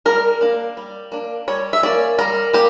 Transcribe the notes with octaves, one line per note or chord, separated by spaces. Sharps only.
G3 A#4
A#3 D4
G3
A#3 D4
G3 C#5
E5
A#3 C#4 D5
G3 A#4
A#3 G4